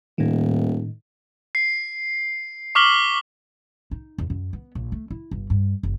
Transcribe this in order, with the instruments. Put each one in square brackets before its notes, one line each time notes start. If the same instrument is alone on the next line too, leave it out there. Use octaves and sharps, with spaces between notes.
[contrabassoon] D#1 [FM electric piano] A2 D#3
[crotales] C7
C#6 D6 F6 B6 F#7 G7
[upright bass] D#4
E2
F#2
B3
A#1
A3
E4
G1
G2
F#1